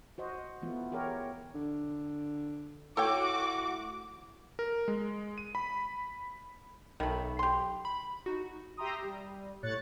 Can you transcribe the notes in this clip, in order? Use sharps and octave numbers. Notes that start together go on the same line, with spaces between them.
F#4 C5 D#5
E3 A3 B3 F4
G4 G#4 A#4 C#5
D3
A2 F#4 A4 C#5 G5 D6
A#4
G#3
D#7
B5
B1 D#3 A3 B5
G4 C6
B5
D#4 F#4
G4 E5 G5 A#5 C6 D#6
G3
A2 C#5 F#6 A6 C#7